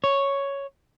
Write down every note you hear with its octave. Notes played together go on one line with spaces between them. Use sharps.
C#5